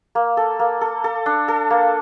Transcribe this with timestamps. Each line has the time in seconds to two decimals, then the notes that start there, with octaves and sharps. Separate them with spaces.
0.15 A#3
0.37 A4
0.59 A#3
0.81 A4
1.04 A4
1.26 D4
1.48 A4
1.70 A#3